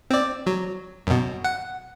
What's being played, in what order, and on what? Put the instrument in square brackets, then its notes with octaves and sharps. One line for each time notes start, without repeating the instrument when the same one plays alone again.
[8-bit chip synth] C4 D5
F#3
F#2 B2
F#5